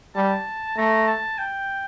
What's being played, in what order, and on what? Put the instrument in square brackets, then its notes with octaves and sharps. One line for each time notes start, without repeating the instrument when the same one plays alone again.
[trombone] G3 [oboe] A5
[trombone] A3 [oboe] A#5
[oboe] A5
G5